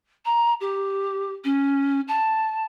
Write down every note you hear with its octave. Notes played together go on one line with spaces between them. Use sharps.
A#5
G4
C#4
A5